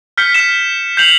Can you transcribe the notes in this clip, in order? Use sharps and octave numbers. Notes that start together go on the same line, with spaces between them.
F6 G6 B6 C#7 G7
F6 B6 E7
G6 C7 F7 F#7